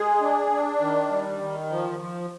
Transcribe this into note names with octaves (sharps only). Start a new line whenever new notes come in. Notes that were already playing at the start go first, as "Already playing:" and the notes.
Already playing: G#3 G#4
D4
D4
D#3
G3
D#3
F3
F3